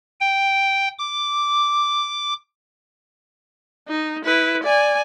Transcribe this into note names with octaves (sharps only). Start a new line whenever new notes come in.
G5
D6
D#4
E4 B4
D5 G#5